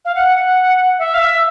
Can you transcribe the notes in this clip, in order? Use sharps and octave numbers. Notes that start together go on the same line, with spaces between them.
F5
F#5
E5
F5
E5